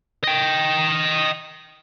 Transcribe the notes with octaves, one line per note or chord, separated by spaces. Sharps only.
D#5 G5